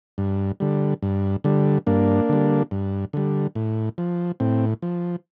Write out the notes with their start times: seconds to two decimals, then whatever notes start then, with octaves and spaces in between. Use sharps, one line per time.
0.18 G2
0.60 D3 G3
1.03 G2
1.44 D3 G3
1.87 G2 A#3 D4
2.29 D3 G3
2.71 G2
3.13 D3 G3
3.55 A2
3.98 F3
4.40 A2 C4
4.82 F3